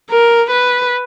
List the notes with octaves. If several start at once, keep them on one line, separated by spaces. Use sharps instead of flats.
A#4
B4